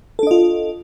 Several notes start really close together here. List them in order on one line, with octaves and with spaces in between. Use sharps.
A4 D4 D#5 F4